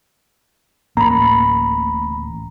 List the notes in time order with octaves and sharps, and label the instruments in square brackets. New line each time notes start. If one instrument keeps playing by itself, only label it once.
[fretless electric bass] D1 A1 A#3 [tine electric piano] A#5 B5